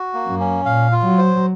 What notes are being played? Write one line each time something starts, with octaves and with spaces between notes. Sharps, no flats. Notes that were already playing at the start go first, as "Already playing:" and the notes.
Already playing: F#4
A#3
F#2
C#4
A#2 F5
F4
F#3
C5